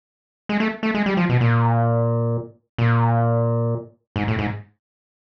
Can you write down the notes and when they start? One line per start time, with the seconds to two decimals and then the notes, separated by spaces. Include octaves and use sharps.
0.49 G#3
0.60 A3
0.83 A3
0.95 G#3
1.06 G3
1.17 F3
1.29 B2
1.41 A#2
2.78 A#2
4.16 G#2
4.28 A2
4.39 G#2